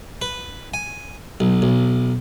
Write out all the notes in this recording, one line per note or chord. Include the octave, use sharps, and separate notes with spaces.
B4
G#5
B1
B1